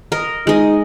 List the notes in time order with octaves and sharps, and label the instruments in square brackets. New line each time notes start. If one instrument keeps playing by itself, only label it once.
[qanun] A#4 D#5
[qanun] G#3 D#5 [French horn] D#4